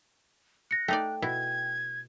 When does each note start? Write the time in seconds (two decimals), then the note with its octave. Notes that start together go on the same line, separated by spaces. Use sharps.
0.71 F#6 A#6 C#7
0.88 A3 D#4 D5 G5
1.22 B2 E4 G#6